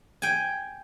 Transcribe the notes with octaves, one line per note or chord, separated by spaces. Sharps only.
G5 G#5